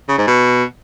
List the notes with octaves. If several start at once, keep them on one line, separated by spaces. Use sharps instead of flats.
C#3
G#2
B2